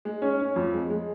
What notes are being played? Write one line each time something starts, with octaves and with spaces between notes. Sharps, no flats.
G#3
C#4
C#4
F2
G#3
G#3